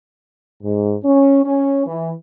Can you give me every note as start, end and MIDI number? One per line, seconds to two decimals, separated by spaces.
0.62 0.94 44
1.03 1.43 61
1.45 1.82 61
1.85 2.11 52